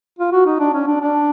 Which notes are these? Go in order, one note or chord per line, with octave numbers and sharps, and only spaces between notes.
F4
F#4
D#4
D4
C#4
D4
D4